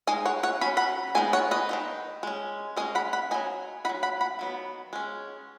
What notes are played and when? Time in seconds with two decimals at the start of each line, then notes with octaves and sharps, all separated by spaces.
0.07 G#3 D#4 D#5 G#5
0.25 C#5 F#5
0.43 C#5 F#5
0.61 F#3 C#4 B5
0.77 F#5 B5
1.15 G#3 B3 D#4 G#5
1.33 C#5 F#5
1.51 B4 D#5
1.69 D#3 B3 D#4
2.23 G#3 C#4
2.77 G#3 C#4 D#5 G#5
2.95 F#5 B5
3.13 F#5 B5
3.31 F#3 D#4 D#5 G#5
3.85 D#4 F#5 B5
3.89 F#3
4.03 F#5 B5
4.21 F#5 B5
4.39 D#3 F#3 B3
4.93 G#3 C#4